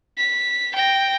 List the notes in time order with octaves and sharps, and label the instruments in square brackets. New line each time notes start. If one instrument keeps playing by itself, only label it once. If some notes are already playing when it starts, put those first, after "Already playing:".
[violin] B6
G5 A#6